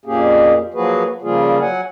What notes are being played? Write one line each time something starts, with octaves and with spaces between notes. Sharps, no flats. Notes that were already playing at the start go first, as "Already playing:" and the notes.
F2 A#2 A#3 C#4 G4 G#4
F3 F#3 A#3 F#4 G#4 B4
C#3 F3 G3 A#3 F4 G#4
F#3 F#5 G#5